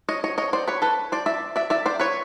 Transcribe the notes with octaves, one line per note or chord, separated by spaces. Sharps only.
C#5 D#5
C#5 D#5
C#5 D#5
C5 D5
B4 C#5
A4 B4
C5 D5
D5 E5
D5 E5
D5 E5
C5 D5
B4 C#5